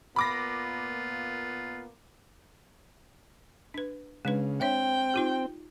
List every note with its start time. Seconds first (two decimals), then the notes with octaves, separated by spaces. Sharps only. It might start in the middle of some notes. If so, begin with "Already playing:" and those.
0.16 A#2 A#3 B3 F4 B5 D6 A#6
3.74 D4 B4
4.25 C#3 G#3 D4 B4
4.61 C4 D4 C#5 E5 G5
5.14 D#4 F4 G4